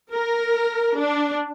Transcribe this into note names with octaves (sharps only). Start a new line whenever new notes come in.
A#4
D4